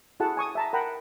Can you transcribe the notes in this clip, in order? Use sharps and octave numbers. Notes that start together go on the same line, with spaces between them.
E4 F#4 G#4 A4 F#5 A5
G#5 C#6 D#6
E5 A5 A#5
A#4 F#5 G5 A#5 B5